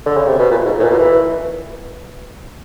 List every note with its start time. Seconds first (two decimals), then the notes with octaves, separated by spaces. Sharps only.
0.05 D3
0.17 C#3
0.27 C3
0.39 B2
0.50 A#2
0.64 G#2
0.79 A2
0.84 A#2
0.89 B2
0.99 E3